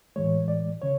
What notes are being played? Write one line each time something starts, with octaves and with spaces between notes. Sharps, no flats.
A2 E3 G#3 C#5
D5
C#3 C#5